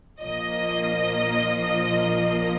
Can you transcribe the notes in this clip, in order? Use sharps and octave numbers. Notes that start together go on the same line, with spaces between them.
A#1 A#2 F3 A#3 D#5